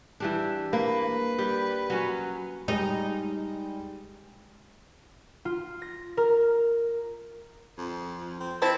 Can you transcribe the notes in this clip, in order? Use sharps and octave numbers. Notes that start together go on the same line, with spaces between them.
E3 G3 D4
A#3 B4
G3
F#3 C#4
G3 G#3 D#4
F4
A#6
A#4
F2
C4
C4 E4 C5 A5